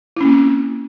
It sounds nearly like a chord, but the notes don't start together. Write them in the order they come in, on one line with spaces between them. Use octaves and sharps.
E4 C#4 A#3 C4